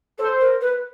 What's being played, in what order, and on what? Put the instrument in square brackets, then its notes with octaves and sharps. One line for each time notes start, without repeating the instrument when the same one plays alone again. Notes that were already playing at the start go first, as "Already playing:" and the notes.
[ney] A4 [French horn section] C5
[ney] A#4
B4